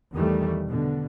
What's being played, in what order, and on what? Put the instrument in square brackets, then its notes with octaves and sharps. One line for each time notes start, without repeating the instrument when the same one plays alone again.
[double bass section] E2 D#3 E3 G3 A3
B2 D3